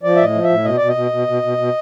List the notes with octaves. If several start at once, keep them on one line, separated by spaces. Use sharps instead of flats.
F3 D5
E5
A2 D#5
F3
E5
A2
B2 D#5
B2 D5
D#5
B2
B2
B2
B2
B2